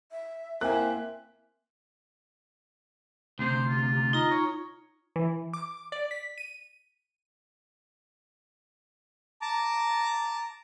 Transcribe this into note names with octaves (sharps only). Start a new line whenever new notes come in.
E5
A#3 C4 E4 E5 G#5 F#6
D2 C3 C5
F4
D#4 F4 D#5 A#5
C#5
E3
D6
D5
B6
D#7
A5 A#5 D6